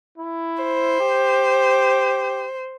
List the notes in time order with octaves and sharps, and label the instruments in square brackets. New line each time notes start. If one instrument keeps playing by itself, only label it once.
[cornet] E4
[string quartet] C5
[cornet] G4